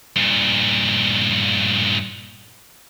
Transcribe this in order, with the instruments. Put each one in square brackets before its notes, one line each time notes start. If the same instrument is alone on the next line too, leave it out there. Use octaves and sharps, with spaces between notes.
[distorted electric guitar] G2 A#2